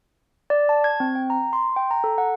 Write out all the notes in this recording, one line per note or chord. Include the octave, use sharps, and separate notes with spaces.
D5
A5
G#6
C4
G5
A#5
C6
G5
A#5
A4
F#5